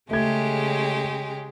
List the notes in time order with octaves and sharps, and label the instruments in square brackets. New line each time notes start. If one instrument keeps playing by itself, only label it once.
[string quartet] C#3 G#3 G4 [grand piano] A3 G#6